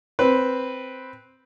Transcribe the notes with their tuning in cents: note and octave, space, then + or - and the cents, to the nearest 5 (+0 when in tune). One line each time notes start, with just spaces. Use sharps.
C4 +0 B4 +0